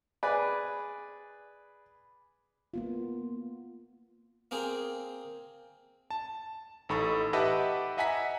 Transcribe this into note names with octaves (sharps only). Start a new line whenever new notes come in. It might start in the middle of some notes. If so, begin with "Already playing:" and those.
G#4 B4 D5
A#3 B3 F4
A#3 C4 G#4 G5
A5
A1 D#4 A4 B5 C#6
G4 B4 D#5 E5 F#5 A5
D#5 E5 F#5 G#5 A#5 B6